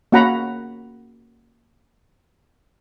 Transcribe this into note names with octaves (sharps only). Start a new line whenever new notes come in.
A#3 C#4 F#4 F#5 A#5 B5